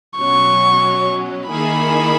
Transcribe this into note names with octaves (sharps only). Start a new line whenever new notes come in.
B2 F#3 C#4 C#6
D#3 A#3 E4 G#4 B5